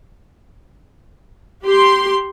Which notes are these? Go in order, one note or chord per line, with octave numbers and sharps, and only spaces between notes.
G4 C6